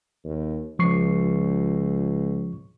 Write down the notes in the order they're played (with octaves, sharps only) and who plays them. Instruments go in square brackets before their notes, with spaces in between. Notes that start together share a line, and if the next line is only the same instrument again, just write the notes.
[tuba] D#2
[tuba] C#2 [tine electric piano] F3 C#6 C7